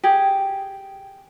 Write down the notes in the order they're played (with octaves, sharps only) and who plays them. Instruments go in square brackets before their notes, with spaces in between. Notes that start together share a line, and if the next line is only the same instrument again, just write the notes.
[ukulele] G4 G#4